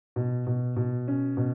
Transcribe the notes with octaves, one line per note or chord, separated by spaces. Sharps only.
B2
B2
B2
C#4
B2